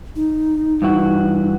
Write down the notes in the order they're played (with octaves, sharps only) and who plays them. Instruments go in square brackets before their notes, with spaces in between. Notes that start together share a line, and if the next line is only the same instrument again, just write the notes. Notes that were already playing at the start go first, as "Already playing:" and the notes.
[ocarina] D#4
[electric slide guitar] G2 E3 F#4